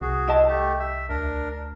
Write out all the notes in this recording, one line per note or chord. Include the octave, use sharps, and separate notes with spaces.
C2 F#4 G#4
E4 D#5 A5
A3 G4
E5
D2 D4 A#4